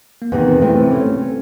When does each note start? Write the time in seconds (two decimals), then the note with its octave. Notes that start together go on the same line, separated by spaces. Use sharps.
0.22 A#3
0.32 E2 C3 D#3 B3
0.47 C4
0.61 C3 E3 A3 C4
0.91 A3 C#4